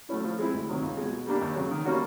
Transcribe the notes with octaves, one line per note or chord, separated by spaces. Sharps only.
F#3 A3 C#4 E4
F3
G#3 C4 E4
D2
C3 D#3 F#3
C#2
B2 G#3
B2
G3 A#3 D4 G4
D#2
C#3 F#3
D#3
G3 A#3 C#4 F#4